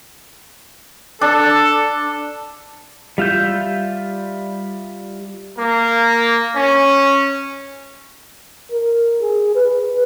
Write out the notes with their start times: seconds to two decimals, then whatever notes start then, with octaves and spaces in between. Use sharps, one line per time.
1.21 D4 A4
3.18 G3 F4 E5 G6
5.58 A#3
6.56 C#4
8.72 A#4
9.22 G#4
9.55 B4